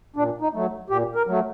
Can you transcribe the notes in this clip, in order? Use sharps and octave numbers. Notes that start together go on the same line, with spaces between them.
A#2 D4
D#4
F#3 A3
A#2 G4
A#4
F#3 A3